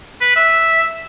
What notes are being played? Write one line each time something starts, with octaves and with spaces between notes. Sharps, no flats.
B4
E5